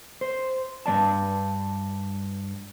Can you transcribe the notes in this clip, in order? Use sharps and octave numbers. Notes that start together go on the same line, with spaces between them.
C5
G2 G#3 D5 A5